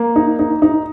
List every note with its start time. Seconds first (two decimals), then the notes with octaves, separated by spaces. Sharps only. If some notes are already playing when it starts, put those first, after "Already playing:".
Already playing: A#3
0.16 D#4
0.39 D#4
0.62 D#4